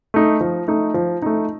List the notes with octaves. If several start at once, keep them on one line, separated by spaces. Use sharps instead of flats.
A3 D#4
F3
A3 D#4
F3
A3 D#4